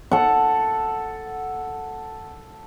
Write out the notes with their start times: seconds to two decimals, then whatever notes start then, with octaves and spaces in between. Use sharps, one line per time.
0.11 A4 F#5